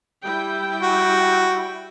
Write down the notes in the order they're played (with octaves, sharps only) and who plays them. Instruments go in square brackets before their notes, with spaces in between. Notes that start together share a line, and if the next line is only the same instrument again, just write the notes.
[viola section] G3 E4 G5
[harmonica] F#4